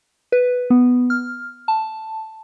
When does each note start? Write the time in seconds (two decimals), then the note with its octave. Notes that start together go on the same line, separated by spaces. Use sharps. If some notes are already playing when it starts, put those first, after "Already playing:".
0.32 B4
0.70 B3
1.10 F6
1.68 A5